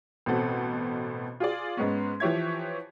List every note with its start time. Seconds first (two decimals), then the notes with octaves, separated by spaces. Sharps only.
0.26 A1 B2 C4 A4 F#5
1.40 F4 G#4 D5
1.77 G#2 G#3 B3 C#4
2.20 E3 F3 G4 C#5 E5 G#6